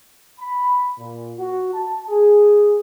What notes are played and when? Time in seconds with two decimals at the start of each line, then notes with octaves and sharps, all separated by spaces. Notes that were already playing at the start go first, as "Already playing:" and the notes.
0.40 B5
0.99 A#2
1.39 F#4
1.73 A5
2.08 G#4